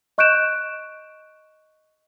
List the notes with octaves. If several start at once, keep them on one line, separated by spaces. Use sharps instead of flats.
D#5 C#6 F#6 G6 D7 E7